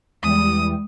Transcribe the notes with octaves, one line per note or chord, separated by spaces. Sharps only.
E2 E3 G3 G#3 D#6